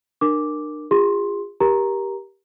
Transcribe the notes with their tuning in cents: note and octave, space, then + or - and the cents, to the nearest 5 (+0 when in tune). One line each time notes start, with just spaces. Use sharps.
D4 +40 A#4 +0 D6 -5
F4 +0 G#4 -40 C6 +5
G4 +0 A#4 +20 A#5 +0